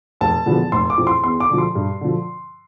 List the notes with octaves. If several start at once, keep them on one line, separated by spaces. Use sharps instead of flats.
F1 A5
E2 D3 F3 B3
F1 C6
D6
F2 E3
C6
E2 C6
D6
D3 F3
C6
G2
D3 F3